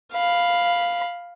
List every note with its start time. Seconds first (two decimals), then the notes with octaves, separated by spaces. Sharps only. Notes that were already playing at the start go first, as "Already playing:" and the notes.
0.13 F5 B5